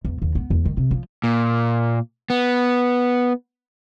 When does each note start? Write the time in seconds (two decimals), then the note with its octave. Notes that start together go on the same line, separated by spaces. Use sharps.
0.05 E2
0.22 D#2
0.35 B3
0.50 E2
0.65 D#3
0.77 C3
0.91 F3
1.24 A#2
2.30 B3